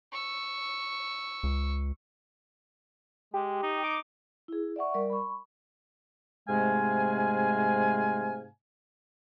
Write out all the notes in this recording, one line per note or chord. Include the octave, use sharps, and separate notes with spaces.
C#6 E6
C#2
G#3 G4
D#4
D6
E4 G#4
D5 E5 F#5 C#6
G3 A#4 D5
B5 C#6
G#2 C3 G#3 A3 F5 G#5